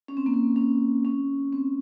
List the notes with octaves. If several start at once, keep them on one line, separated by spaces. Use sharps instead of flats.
C#4
C4
A#3
C4
C#4
C#4
C4